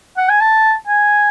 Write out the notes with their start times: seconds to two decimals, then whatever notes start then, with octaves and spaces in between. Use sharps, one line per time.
0.18 F#5
0.29 G#5
0.41 A5
0.88 G#5